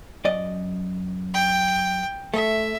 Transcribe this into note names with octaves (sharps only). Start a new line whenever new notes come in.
F#2 D5 D#5
G5
A3 E5